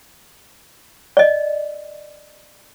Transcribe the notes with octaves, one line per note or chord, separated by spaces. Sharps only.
D5 D#5